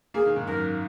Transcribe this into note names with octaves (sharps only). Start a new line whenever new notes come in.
A#3 G#4
D#3
G#2
F#2 A#4